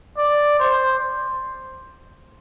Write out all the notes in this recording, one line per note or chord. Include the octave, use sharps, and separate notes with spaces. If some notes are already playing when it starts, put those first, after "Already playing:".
D5
C5